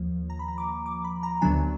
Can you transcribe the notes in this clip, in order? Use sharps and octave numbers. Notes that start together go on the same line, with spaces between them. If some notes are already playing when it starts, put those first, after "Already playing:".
Already playing: D#2 F3 A#3
A#5
B5
A#5
D6
D6
B5
A#5
D2 D3 F#3 B3 D4 G#5